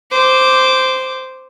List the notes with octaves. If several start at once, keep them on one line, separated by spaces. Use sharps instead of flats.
C5 D6